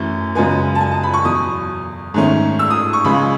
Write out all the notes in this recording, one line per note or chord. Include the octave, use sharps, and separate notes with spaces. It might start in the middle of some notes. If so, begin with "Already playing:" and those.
Already playing: F#2 E3 A3 C#4
F#2 C#3 G#3 B3 G#5
A5
G#5
A5
B5
C#6
E2 B2 F#3 D#6
G#2 D#3 A3 C#4
E6
D#6
C#6
C#2 C#3 G#3 B5